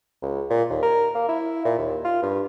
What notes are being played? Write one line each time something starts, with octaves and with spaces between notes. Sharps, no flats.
C#2
A#2
D#2
A#4
A#3
E4
A#2
D#2
F4
G2